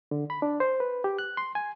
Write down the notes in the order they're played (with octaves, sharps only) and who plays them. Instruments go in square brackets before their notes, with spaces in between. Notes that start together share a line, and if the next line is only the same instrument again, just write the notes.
[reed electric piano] D3
B5
D4
C5
B4
G4
F#6
C6
G#5